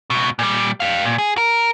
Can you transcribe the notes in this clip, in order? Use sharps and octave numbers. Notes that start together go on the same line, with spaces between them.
C#2 B2
A#2 G3
G4 F5
A#2
G#4
A#4